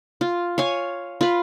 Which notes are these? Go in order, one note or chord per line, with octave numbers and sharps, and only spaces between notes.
F4
C#5 F5 G#5
F4 B4